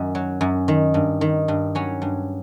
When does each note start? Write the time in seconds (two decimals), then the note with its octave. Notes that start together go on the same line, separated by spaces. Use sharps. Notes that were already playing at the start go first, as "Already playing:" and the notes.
Already playing: F#2 D#3
0.15 F#3
0.41 F#2
0.68 D#3
0.94 G2
1.21 D#3
1.48 G2
1.75 F#3 C#4
2.02 G2